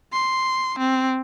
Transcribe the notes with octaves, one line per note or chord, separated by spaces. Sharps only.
C6
C4